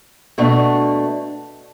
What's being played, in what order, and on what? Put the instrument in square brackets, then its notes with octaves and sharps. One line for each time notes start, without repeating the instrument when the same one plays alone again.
[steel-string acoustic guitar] B2 A3 D4